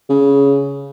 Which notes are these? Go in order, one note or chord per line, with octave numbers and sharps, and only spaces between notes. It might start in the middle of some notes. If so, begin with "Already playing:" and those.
C#3